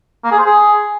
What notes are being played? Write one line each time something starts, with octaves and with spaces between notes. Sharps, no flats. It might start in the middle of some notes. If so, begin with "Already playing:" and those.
A#3
G#4
C5
G#4